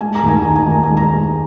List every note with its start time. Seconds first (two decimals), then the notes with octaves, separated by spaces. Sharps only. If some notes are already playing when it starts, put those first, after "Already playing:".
0.01 G#3 G#5
0.15 A#5
0.23 D#2 G#5
0.42 D#3 A#5
0.56 G#5
0.68 D#2 A#5
0.83 G#5
0.90 G#3
0.97 A#5